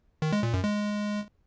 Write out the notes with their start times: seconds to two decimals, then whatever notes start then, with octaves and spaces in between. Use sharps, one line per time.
0.22 D#3
0.32 G#3
0.43 A#2
0.53 F#2
0.64 G#3